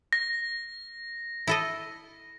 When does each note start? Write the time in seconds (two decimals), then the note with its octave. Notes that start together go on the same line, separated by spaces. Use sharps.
0.13 A#6
1.47 E4 A4 D#5